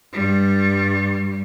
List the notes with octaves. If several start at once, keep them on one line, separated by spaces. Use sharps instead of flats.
G2 G3